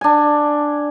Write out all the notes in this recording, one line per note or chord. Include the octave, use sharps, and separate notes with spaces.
D4 G#5